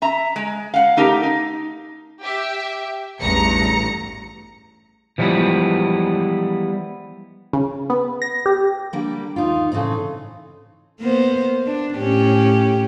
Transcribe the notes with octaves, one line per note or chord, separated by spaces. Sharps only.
E5 A#5
G#3
F5 F#5
A3 D#4 G4 A#4
D#4
G4 E5
A1 E2 G2 A#5 C#7
E3 F3 G3 G#3 B3 E4
C#3
B3
A#6
G4
D3 G3 A#3
D#2 D#4 F4
A2 C#3 E3 C4 D#4
A#3 B3 C5
D4
A2 C#4 G4